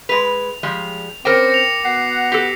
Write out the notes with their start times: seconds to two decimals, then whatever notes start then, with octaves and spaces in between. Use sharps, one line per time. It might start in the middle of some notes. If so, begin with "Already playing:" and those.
0.09 G#3 B4 F7
0.63 F3 G3 G#3
1.25 C4 C#4 A#4 C5 G5 D6 A#6 C#7
1.50 A#6 C#7 F7
1.85 B3 F#4 F#5 C7
2.32 G4 A4